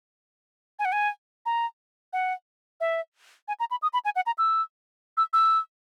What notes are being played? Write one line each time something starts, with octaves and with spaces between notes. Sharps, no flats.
G#5
F#5
G#5
A#5
F#5
E5
G#5
A#5
B5
D#6
B5
G#5
F#5
A#5
E6
E6
E6